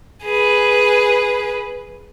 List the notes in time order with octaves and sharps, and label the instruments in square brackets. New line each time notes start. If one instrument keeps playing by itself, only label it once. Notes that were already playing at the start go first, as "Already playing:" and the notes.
[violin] G#4 B4